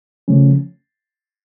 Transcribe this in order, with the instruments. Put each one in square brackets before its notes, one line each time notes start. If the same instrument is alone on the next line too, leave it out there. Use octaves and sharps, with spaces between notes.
[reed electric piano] C#3 F3 A3 C#4